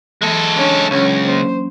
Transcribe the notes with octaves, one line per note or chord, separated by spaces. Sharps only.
E3 G#3 A4
C#4 D4
C#2 F#3 C#4 C#5
F#3 A#3 C#4 C5